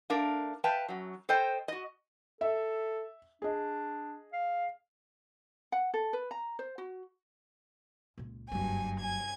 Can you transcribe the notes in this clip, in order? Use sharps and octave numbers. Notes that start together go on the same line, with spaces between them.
A3 D4 A#4 F5
B4 E5 F5 G5 A5
F#2 F#3
A4 C5 D#5 G5
F#4 D#5
A4 E5
D4 G#4 D#5
F5
F#5
A4
B4
A#5
C5
F#4
C#2 A#2
F#1 G2 F#3 G#5
G#5 G#6